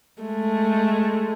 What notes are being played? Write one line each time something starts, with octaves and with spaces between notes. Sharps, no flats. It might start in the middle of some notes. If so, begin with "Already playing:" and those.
G#3 A3